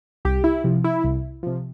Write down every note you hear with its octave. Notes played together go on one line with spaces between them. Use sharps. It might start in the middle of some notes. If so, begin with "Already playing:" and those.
C2 G4
E4
C3 F3
E4
C2
C3 F3